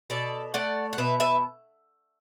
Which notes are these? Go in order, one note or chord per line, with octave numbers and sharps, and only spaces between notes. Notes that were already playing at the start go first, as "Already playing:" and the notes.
B2 A4 D5
A3 D5 F#5
F#5
B2 B4 E5
B4 E5